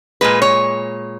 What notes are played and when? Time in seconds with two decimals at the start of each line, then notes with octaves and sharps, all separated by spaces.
0.21 A#2 G#3 B4
0.42 C#5